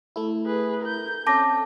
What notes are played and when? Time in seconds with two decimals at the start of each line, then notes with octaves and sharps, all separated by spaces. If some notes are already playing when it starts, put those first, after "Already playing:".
0.16 A3 E4
0.46 G#4 B4
0.82 A#4 G6
1.27 C4 C#4 A4 A5 D6 A#6